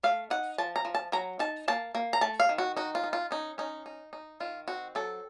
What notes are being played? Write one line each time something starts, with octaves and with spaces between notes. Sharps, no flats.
A3 F5
D#4 F#5
F3 A5
A#5
F3
A5
F#3 A#5
D#4 A5
A#3 A5
A#3
A#5
A3 A5
F5
D#3
F#4
D#4 F#4
F4
D#4
F4
C#4 D#4
C#4 D#4
D#4
D#4
D#3 F4
C4 F#4
F#3 A4